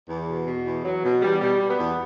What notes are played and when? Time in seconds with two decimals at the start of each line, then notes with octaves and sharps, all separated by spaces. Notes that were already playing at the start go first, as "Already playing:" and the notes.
0.09 E2
0.29 B2
0.47 B2
0.65 E2
0.84 E2 F#3
1.04 B2
1.22 E2 G3
1.41 B2 G3
1.59 B2
1.69 B3
1.79 E2